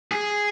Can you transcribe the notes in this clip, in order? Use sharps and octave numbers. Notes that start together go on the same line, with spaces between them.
G#4